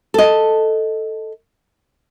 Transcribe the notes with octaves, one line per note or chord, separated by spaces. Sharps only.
A4 D#5